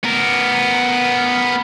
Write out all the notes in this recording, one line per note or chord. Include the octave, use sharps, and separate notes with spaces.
B3 A#4